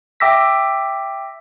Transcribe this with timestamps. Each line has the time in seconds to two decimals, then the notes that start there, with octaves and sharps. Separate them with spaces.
0.20 E5 G5 D6 E6 A#6 B6